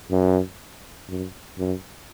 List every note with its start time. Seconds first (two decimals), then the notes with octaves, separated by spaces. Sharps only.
0.11 F#2
1.09 F#2
1.58 F#2